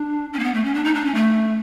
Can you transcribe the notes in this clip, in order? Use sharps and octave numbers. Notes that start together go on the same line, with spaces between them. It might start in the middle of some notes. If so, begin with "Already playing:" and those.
Already playing: D4
C#4
A#3
B3
A3
C#4
D4
D#4
D4
C#4
A3